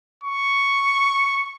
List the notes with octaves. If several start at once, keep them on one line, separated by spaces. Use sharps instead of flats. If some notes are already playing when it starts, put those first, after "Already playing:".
C#6